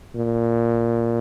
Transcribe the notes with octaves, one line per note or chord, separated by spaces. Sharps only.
A#2